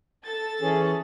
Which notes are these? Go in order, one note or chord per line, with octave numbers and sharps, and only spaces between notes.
A4 A6
E3 C#4 G#4